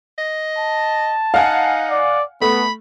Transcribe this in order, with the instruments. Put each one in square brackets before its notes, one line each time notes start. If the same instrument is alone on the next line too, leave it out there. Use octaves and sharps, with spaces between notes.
[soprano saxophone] D#5
[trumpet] A5
[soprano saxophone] D#4 [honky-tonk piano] F5 F#5 G#5
[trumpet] D5
[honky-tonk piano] A3 [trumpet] B3 [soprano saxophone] B5